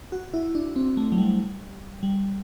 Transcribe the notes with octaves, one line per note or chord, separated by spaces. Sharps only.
F#4
E4
D4
C4
A3
F#3
G3
G3